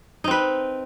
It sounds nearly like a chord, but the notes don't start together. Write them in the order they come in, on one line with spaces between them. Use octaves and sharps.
D#4 C4 B4